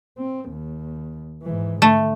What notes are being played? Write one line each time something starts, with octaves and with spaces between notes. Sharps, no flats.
C4
D#2
G#2 E3
D3 A3